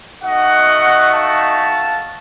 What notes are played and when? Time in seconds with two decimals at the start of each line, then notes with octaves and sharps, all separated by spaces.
0.23 A3 D#4 F#4 D#5 F#5
1.13 F5 A5